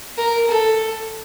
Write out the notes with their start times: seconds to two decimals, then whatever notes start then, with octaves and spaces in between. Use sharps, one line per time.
0.17 A#4
0.48 A4